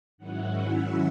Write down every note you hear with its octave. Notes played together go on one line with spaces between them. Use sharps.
G#2 D#3 F#3 C#4 E4 F#5
E5